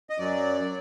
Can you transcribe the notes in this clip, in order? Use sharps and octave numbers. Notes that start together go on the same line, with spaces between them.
D#5
F#2 F#3 D5
F#3